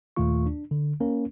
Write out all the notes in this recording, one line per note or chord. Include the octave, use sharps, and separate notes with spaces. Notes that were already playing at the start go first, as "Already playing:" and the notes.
D#2 A#2 D#3 A3 F4 C#6
D4
D3
A#3 C#4 A#4